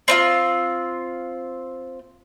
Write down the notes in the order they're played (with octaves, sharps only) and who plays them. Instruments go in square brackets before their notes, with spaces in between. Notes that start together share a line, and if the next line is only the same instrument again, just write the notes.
[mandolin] C4 D4 F4